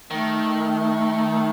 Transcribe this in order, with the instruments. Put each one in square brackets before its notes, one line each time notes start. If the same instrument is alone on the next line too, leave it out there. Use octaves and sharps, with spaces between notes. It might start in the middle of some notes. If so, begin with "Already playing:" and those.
[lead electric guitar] D#3 [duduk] A3